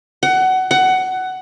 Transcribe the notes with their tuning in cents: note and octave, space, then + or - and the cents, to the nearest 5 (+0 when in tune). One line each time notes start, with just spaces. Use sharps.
F#5 +20
F#5 +15